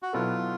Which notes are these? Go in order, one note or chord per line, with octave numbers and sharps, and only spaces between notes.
F#4
B2 F#3 B3 E4 F4 A4